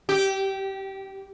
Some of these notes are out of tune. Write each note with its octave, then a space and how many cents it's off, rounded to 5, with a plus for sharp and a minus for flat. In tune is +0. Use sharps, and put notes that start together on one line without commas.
G4 -20